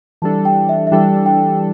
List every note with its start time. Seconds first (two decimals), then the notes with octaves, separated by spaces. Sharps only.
0.22 E3 G3 D4 A4 A5
0.45 G5
0.69 E5
0.87 E5
0.92 E3 G3 D4 A4 G5
1.26 G5